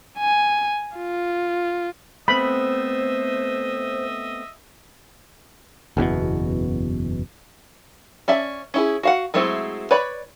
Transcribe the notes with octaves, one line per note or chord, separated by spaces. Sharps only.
G#5
F4
A3 B3 C4 C5 D#5 E5 B5
F#1 E2 G2 B2
C#4 D5 E5 A5
C#4 E4 G#4
F#4 F5 F#5
F#3 G#3 A3 C4 E4
B4 C#5 D5 B5